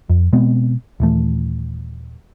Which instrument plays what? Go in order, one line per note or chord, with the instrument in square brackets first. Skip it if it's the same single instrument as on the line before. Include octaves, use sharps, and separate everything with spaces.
[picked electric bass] F2
B2 G#3 B3 C4
D#1 E3 A3